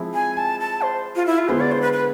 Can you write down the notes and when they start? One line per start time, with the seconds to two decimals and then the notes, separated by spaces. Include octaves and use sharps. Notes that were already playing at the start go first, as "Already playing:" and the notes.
Already playing: F3 G#3 C4 E4
0.14 G#5
0.37 A5
0.60 A5
0.82 C5
1.16 F4
1.26 E4
1.38 F4
1.48 D3 G#3 B3 E4 C5
1.61 D5
1.72 C5
1.82 B4
1.93 B4